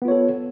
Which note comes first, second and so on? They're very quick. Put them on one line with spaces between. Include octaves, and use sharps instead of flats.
B3 F4 C#5 A4